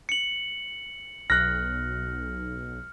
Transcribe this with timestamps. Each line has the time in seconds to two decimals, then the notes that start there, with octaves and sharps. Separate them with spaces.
0.09 C#7 F#7
1.30 B1 F6 F#6 A#6